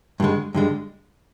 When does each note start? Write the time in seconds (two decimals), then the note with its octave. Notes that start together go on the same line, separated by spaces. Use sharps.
0.20 G2 D3 G#3
0.54 G2 D3 G#3